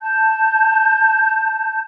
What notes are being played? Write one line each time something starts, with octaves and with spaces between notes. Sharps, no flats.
A5 G6